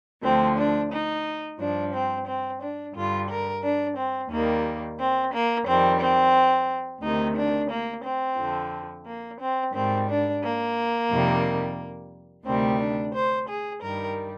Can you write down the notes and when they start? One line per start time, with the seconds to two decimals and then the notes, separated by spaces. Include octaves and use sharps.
0.23 D2 D3 F3 C4
0.56 D4
0.91 D#4
1.59 G2 F3 D4
1.93 C4
2.26 C4
2.60 D4
2.94 G2 D3 G3 F4
3.28 A#4
3.62 D4
3.96 C4
4.30 D#2 D#3 G3 A#3
4.99 C4
5.32 A#3
5.66 F2 D#3 G3 C4
6.00 C4
7.02 D2 C3 D#3 D#4
7.36 D4
7.69 A#3
8.04 C4
8.37 F2 D3 F3
9.06 A#3
9.39 C4
9.73 G#2 D#3 G3 C4
10.08 D4
10.42 A#3
11.10 F2 C3 D#3 G3
12.45 D2 C3 D#3 G3 C4
12.79 D4
13.13 C5
13.47 G#4
13.81 G2 D#3 G3 A#4